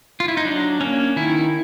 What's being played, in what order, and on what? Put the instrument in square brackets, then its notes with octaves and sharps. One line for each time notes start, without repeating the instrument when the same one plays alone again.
[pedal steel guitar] F4
E4
D#4
F#3 D4
A#3 C#4
D#3 E4